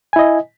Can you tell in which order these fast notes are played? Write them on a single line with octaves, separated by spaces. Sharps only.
G#5 E4 D#5